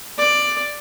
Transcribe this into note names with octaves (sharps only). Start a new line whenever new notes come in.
D5